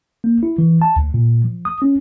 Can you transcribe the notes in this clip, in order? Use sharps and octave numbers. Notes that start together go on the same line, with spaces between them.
A#3
E4
E3
A5
D2
A#2
F3
D#6
C#4